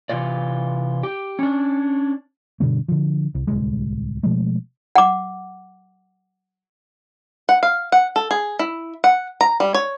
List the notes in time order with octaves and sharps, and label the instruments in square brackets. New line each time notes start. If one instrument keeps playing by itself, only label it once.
[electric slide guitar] C3 E3 F4 D5
G4
C#4 D4
[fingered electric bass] G2 B2 D3 A#3
D3 F3
C2
D1 C2 G#3
B2 F3 G#3 A3
[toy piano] F#5 D6
[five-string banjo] F#5
F5
F#5
A4
G#4
E4
F#5
A#5
G3
C#5